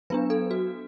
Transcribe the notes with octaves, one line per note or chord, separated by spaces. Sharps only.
F#3 B3 D4 B4
A4
F#4